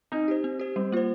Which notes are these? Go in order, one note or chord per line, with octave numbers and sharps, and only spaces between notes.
C4 D#4
G4 C5
C4
G4 C5
G3 C4
A#3 F4 C5